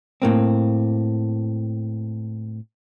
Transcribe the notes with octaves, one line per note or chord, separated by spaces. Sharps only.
A2 A#3 C4